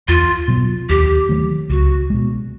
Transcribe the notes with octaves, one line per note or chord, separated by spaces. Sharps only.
E2 F4
B2 F#3
D#2 G4
D#3 F#3 A3
C#2 F#4
B2 G#3